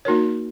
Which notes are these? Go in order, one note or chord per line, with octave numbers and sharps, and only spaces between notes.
A#3 D#4 F#4 A#4 C#5